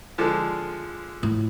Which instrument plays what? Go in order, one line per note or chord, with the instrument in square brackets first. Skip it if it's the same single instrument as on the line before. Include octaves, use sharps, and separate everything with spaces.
[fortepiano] D3 F3 G#3
[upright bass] A2